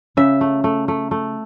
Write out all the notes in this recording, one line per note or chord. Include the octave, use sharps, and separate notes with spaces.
C#3 E5
A3
A3
A3
A3